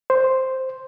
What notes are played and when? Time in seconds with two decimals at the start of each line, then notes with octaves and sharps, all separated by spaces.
0.10 C5